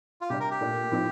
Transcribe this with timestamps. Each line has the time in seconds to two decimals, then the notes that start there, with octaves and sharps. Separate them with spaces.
0.21 F4
0.30 C3 G3 D4 G4
0.40 A#4
0.51 G4
0.61 A#2 A3 D4
0.92 A2 F3 C4 D#4